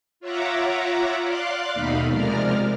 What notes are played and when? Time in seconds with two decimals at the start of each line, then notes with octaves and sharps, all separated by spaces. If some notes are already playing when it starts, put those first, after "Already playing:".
0.20 F4 C#5 E5 F#5 A#5 D6
1.23 D5 F5 C6 D6 F#6
1.74 D#2 B2 A3 D#4 F5 B5
2.08 C3 F3 G#3 A#4 D5 F6